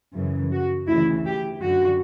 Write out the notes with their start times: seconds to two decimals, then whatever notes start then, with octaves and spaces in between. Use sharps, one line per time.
0.14 F#2 C#3 E3
0.51 F#4
0.88 D2 C#3 E3 E4
1.26 G4
1.62 F#2 D3 F#4